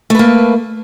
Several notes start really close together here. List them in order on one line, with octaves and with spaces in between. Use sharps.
A3 B4 A#3